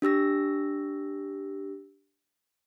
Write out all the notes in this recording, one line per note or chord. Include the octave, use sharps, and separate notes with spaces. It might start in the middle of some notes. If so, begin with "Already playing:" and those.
D4 G4 E6 A#6